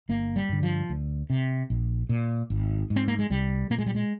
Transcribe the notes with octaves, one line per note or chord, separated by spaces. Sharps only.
G1 A#3
G3
G2 D3
F3
D2
C3
A#1
A#2
G#1
G#2
C4
A#3
G#3
C2 G3
A#2 A#3
G#3
G3
G#3